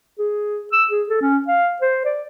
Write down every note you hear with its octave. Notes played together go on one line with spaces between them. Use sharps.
G#4
E6
G#4
A4
C#4
F5
C5
D5